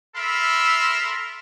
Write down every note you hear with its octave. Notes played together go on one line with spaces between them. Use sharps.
A4 A#4 E5 B5 C6